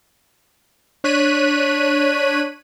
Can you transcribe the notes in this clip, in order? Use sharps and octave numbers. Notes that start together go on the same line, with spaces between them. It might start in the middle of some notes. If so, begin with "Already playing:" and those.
D4 C#5 F#6 B6 D#7